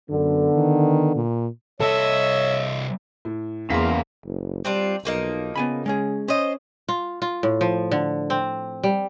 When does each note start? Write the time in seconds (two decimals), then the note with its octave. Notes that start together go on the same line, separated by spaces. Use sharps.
0.11 F#2 D3 B3
0.55 D#3
1.15 A#2
1.80 C2 A4 C#5 D#5 E5
3.25 A2
3.70 E2 C#3 A#3 F5 C6 B6
4.24 F#1
4.65 G3 C4 D4 F4
5.05 B1 F3 A#3 D#4
5.56 C#3 B3 G#5 B5
5.86 G#3 C#4 G#4
6.28 C#4 C5 D#5
6.88 F4
7.22 F4
7.43 A2
7.61 F3
7.91 D3
8.30 C4
8.83 G3